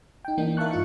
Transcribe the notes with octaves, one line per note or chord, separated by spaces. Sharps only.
D#4 G5
E3 A#3 D4 D#4
A#4 E5 F5 A5 C#6 F#6
G2 F4 C#7